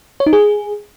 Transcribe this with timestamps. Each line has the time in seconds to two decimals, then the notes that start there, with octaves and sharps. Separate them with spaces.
0.20 C#5
0.26 D#4
0.33 G#4